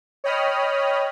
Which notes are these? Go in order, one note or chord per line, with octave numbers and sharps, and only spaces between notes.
C#5 D#5 G5 B5 D#6 F6